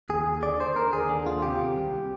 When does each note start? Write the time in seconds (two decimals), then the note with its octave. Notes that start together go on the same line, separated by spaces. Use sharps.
0.09 D#2 G#4
0.26 D#2
0.43 D3 D5
0.60 D3 C5
0.75 D#2 A#4
0.93 D#2 G#4
1.09 D3
1.26 D#2 F4
1.42 C3 G4
1.59 C3
1.76 C2